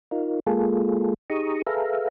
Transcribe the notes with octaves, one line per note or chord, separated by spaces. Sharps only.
D#4 F4 A#4
G#3 A#3 F4 G#4 A4
D#4 G4 G#4 A#5 C#6 D#6
G#4 A4 B4 E5 F5 A#5